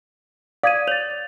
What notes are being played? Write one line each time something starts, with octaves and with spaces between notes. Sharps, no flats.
D5 F5 D#6 G#6 D#7
C#5 A6 F7